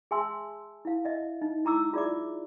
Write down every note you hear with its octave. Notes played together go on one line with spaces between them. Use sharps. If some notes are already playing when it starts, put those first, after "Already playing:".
G#4 E5 G#5 A5 C6 E6
E4 F5
D#5 E5
D#4
E4 A#5 D6 E6
F4 G#4 D5 E5 D6